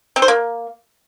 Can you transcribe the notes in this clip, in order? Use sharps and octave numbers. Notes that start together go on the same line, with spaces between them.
C4
C5
A#3